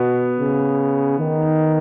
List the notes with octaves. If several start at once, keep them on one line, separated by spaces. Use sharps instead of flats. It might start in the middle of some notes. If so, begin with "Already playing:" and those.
Already playing: B2 B3
C#3
D#3